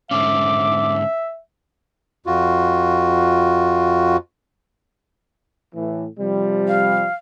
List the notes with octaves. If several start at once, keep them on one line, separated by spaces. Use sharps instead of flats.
G#2 D3 C#4 E5 D6
F2 F4 F#4
A2 E3
C3 F3 G3
F5